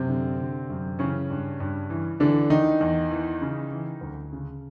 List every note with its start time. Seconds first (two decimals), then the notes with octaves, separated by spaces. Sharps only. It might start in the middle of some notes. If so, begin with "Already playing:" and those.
Already playing: F#2 C3 C4
0.09 D3
0.39 D3
0.70 F#2
0.99 C#3 E3 C#4
1.30 G2
1.60 G2
1.90 E3
2.20 D3 E3 D4
2.50 D#3 E3 D#4
2.81 E2
3.11 E3
3.42 C#3
3.72 E3
4.01 D2
4.33 C#3